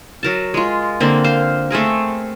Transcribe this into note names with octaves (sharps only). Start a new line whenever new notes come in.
F#3 A#4 A5
G#3 F4
D3 A#3 C4
C5 F5
A3 C4 G#4 A#4